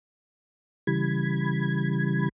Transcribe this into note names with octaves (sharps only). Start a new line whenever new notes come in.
C#3 E3 G3 B5 G#6